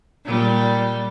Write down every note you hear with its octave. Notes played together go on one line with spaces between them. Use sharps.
A#2 G3